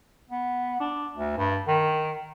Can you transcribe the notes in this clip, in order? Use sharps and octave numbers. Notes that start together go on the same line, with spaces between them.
B3
D4
D2
G2
D#3